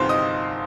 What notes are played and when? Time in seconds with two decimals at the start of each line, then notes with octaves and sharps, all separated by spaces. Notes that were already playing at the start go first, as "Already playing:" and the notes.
Already playing: G1 C3 D#3 F4 C5 F5 C6
0.09 D#5 D#6